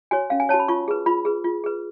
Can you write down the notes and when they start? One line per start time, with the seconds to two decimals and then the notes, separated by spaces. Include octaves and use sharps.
0.11 F#4 C#5 G#5
0.30 C#4 F5
0.40 G#5
0.49 F#4 C#5 A5
0.59 B5
0.68 F4 C#6
0.88 G#4 B4
1.06 F4 B5
1.25 G#4 B4
1.44 F4
1.64 G#4 B4